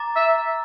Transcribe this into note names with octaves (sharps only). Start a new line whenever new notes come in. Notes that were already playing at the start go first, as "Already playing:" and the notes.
Already playing: A#5 D6 A6
E5